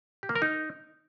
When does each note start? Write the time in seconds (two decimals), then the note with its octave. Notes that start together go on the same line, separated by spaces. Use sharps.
0.23 G4
0.29 A#3
0.36 A#4
0.42 D#4